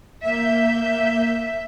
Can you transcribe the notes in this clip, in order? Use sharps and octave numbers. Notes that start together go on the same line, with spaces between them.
A#3 E5 G6